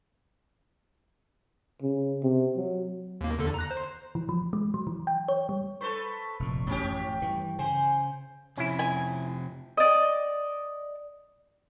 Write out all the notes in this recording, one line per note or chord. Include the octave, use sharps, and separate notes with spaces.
C#3
C3
F#3
D#2 A#3
E2 D3 A4
A#5 F#6
C5
E3
F3
G#3
F#3
E3
G5
C#5
G3
A4 B4 C5 C#6
F1 A#2
A1 F#2 F3 C#4 G4
G2 E3
C#3 C5 G#5
C3 F3 C#4 E4
G#5
D5 D#5